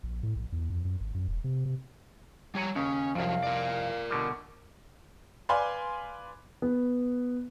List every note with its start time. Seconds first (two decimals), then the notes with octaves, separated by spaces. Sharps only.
0.03 A#1
0.23 A2
0.36 A#1
0.52 E2
0.70 F2
0.85 F#2
1.00 G#1
1.15 F#2
1.28 E1
1.44 C3
1.65 C3
2.55 G3 C#5 F#5 G#5 A#5
2.76 D#2 C#3 C#4
3.15 C2 F2 F3 F#3 F5
3.43 A#4 D5
4.10 B2 D3 G3
5.49 B4 D5 F5 G#5 B5 C6
6.62 B3